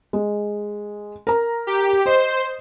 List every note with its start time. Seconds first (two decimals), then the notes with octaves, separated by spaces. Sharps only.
0.13 G#3
1.27 A#4 A#5
1.67 G4
2.06 C5 D#5